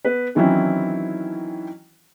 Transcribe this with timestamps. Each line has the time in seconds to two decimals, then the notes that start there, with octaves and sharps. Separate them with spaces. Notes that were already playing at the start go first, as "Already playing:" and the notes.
0.05 B3 B4
0.35 D#3 E3 F#3 C4 C#4 E4